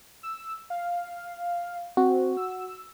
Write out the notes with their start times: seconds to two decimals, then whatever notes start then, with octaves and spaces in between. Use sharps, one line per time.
0.23 E6
0.70 F5
1.97 C4 F#4
2.37 E6